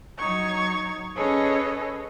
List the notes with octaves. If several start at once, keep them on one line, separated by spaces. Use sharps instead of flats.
F#3 D#4 C#5 C#6 G#6
C#4 G#4 A4 B4 C#5 D#5